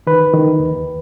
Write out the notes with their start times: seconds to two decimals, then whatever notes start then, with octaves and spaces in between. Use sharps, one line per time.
0.07 D#3 B4
0.34 D#3
0.59 D#2